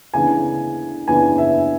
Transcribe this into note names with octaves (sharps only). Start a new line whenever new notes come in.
D2 C#3 E3 B3 D4 G#5
D2 C#3 E3 B3 D4 G#5
E5